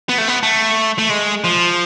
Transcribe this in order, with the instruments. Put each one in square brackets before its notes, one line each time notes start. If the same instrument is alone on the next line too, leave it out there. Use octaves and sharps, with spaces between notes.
[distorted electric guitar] B3
A3
B3
A3
A3
G#3
F3